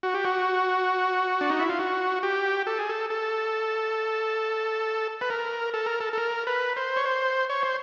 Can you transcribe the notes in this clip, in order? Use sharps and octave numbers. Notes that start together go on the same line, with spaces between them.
F#4
G4
F#4
D4
D#4
E4
F4
F#4
G4
A4
G#4
A4
A4
B4
A#4
A4
A#4
A4
A4
A#4
B4
C5
C#5
C5
C#5
C5